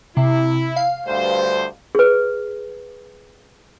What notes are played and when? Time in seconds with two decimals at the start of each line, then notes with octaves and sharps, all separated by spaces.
0.17 C3 E4
0.76 F5
1.07 D2 G2 C5
1.95 G#4 B4